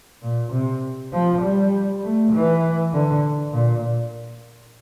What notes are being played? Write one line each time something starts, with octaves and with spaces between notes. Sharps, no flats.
A#2
C3
F3
G3
A3
E3
D3
A#2